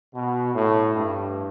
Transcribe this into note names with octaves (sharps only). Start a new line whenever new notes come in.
B2
A2
G2